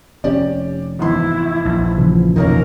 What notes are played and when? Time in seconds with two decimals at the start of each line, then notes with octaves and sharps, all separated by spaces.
0.24 F1 C#4 G4 D5
0.99 G#1 E2 E4 C6
1.65 A#1
1.98 C#3 E3 F3
2.36 F1 D#2 B2 A#3 C#4 D#4 A#4